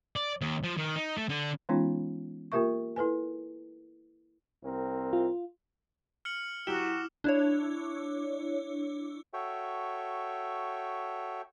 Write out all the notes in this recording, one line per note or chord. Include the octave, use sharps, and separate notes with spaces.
D5
D#2
F3
D#3
D#4
A3
D3
E3 G#3 B3 C#4 D#4 F4
A#3 F4 G4 A#4 E5 C#6
E4 A4 B4 G#5
C2 C4 A#4
F4
F6 C#7 F#7
F#3 E4 F#4 G4 D6 E7
D4 E4 C#5
F#4 A4 C#5 E5 G5